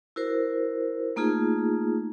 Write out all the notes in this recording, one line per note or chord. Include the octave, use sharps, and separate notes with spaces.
E4 F#4 A#4 C5
A3 A#3 D#4 F4 G#4